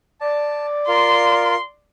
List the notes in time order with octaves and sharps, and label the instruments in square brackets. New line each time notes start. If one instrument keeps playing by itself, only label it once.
[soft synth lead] D5 [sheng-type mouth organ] A5
[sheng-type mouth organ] F4 A#4 F5 [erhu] C6